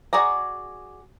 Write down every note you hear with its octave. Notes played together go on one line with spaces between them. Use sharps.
F#4 G#4 D5 A#5